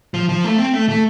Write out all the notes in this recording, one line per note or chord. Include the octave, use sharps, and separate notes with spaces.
F3
F3
A3
C4
A3
A3